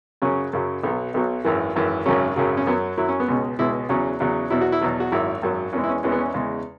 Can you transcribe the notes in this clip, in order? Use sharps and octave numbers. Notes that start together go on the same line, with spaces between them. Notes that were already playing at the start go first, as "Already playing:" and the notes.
F#2 C#3 F#3 C#4
F#2 C#3 F#3
B1 B2 F#3 B3
B1 B2 F#3
G#1 F#2 E3
G#1 F#2 E3
G#1 F#2 C#3 F#3 C#4
G#1 F#2 C#3 F#3
C#4
F#2 F#3 B3
F#2 F#3 E4
C#4
B3
C#2 B2 G#3 C#4
C#2 B2 G#3 E4
E2 C#3 F#3 C#4
E2 C#3 F#3
E2 B2 F#3 E4
F#4
E4
E2 B2 F#3
F#4
G#1 F#2 F#3 E4
G#1 F#2 F#3
E2 E3 G#3 C#4
E4
C#4
E2 E3 G#3 C#4
B3
C#4
E2 C#3 G#3